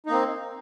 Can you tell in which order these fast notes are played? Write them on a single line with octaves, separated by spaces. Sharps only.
D#4 A#3 C4